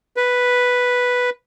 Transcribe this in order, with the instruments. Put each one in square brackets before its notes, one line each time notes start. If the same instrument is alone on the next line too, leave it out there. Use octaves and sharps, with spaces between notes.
[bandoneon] B4